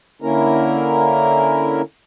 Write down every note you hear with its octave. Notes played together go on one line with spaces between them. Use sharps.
D3 A#3 C#4 E4 A#4 A#5